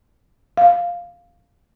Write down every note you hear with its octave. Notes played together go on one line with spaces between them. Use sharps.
F5